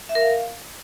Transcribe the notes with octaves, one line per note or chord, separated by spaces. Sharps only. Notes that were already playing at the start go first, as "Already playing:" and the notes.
E5
A#4
F5